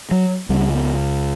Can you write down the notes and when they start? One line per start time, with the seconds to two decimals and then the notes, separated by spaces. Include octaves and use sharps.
0.11 F#3
0.49 C#2 C#3 G3
0.75 B3